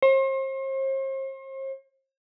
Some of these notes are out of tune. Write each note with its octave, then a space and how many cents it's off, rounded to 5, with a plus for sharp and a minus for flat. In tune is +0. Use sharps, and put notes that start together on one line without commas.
C5 +40